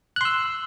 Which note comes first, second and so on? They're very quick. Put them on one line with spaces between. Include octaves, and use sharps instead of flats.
F#6 C6 E6